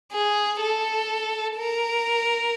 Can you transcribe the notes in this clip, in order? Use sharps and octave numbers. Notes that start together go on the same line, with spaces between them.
G#4
A4
A#4